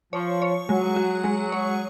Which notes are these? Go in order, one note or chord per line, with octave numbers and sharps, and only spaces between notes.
F3 C#5
C#5
F#3 G#3
F#4
G#3
C#5